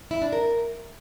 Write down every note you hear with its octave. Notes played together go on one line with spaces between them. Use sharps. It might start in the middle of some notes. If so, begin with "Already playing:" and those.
E4
D4
A#4